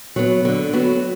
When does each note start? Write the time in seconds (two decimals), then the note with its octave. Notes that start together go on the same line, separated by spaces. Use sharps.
0.16 F#3 B3
0.45 D3
0.73 F#3 B3